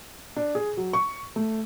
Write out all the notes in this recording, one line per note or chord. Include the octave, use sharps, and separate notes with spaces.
D4
G#4
F#3
C#6
A3